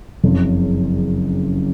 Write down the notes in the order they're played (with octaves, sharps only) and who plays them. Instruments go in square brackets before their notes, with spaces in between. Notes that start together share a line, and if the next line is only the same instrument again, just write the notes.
[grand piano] F#1 F2 C#3